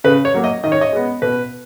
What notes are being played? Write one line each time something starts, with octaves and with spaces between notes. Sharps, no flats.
C#3 B4
C#5
F#3 A#3
D#5
D#3 D#5
C#5
D#5
G#3 B3
B2 B4